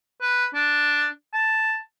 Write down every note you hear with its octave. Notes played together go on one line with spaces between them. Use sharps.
B4
D4
A5